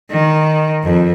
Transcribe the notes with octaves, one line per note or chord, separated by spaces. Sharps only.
D#3
F2